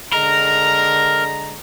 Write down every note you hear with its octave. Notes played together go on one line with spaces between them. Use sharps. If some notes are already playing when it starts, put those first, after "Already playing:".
D3 G#3 A#4 A#5